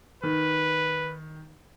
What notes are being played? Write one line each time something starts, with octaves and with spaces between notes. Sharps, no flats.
D#3 B4